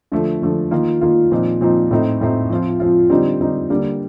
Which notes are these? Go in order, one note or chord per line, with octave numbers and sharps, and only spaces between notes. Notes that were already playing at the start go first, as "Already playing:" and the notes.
D3 F3 A3
D3 F3 A3
D#3 A#3 F4
D#3 A#3 F4
A#2 F3 C4 D#4
A#2 F3 C4 D#4
A2 A3 C4 D#4
A2 A3 C4 D#4
F3 C4 F4
F3 C4 F4
D3 G3 C4 D#4
D3 G3 C4 D#4
D3 G3 A#3